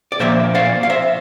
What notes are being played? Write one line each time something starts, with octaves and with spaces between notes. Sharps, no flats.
D5
A#2 F3 A#3 C5 E5
D5 F5
F5
C5 E5